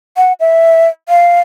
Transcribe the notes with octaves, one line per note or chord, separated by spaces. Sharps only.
F#5
E5
F5